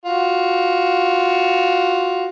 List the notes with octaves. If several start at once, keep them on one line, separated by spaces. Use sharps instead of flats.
F4 F#4